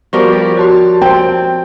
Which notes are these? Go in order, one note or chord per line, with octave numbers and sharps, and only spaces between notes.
F3 G3 B3 F4 F#4 A#4 C#6 D6
G4
F#4 C#5 A5 C6
C4 G5